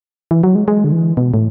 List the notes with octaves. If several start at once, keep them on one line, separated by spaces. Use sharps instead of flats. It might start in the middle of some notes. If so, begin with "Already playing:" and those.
E3
F#3
G#3
G#3
D3
E3
B2
A2